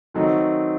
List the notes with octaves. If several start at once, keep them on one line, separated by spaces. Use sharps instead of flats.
D#3 F#3 A3 C4 D#4